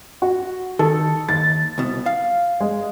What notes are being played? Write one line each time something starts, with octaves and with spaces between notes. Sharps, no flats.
F#4
D#3 A4
D#2 A6
C2 B2
F5
G#3